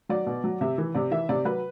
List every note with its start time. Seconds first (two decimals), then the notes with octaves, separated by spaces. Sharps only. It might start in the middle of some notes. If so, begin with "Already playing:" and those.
0.09 F#3 D5
0.26 B2
0.44 F#3
0.61 C3 E5
0.78 E3
0.95 C3 D5
1.11 E3 E5
1.29 C3 D5
1.45 F#3 B4